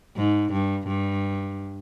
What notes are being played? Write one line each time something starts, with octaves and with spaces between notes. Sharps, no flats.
G#2
G2
G2